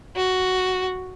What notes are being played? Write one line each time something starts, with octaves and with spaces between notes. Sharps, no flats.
F#4